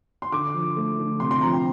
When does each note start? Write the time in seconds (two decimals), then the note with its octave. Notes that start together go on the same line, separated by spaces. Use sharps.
0.22 C6
0.32 D3 D6
0.54 F3
0.77 A3
0.98 D3
1.20 C3 C6
1.31 C6
1.41 F3 A#5
1.52 G5